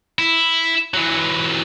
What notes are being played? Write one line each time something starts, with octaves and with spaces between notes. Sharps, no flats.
E4
E3 F#3